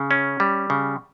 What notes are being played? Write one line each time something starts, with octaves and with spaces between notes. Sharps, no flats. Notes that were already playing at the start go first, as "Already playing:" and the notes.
Already playing: C#3
C#4
G3
C#3